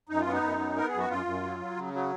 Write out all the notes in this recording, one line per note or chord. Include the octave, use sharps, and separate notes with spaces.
F#2 D#4
F4
B3
D#4
F#2
B3
B3 A#4
F#2 G#4
F#4
F#2 F4
F#2
F#3
F#3
C#3
F#3